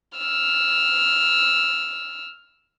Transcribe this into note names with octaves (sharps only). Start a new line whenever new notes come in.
E6 F6